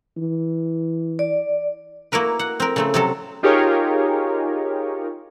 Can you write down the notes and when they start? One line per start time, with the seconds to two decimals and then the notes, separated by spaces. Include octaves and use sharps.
0.17 E3
1.19 D5
2.12 A#3 E4 F#4 A#4 B4
2.39 F#5
2.60 C4 A#4
2.76 C#3 A3 C4
2.94 C3 F#3 A4
3.43 D#4 F4 G4 G#4 A#4 C#5